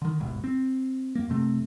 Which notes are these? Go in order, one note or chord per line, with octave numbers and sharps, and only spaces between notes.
D3 D#3
D1 G1 G#2 B2
C4
F#2 A#3
F#2 C3 A3 C4